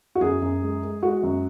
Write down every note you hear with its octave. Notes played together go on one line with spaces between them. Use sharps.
F#4
F#2 G#4
F#2
G#3
G#3
G#3 F#4
F#2